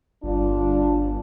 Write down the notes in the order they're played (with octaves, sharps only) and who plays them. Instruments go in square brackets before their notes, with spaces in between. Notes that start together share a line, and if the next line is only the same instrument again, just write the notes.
[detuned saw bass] G1 [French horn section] D4 F4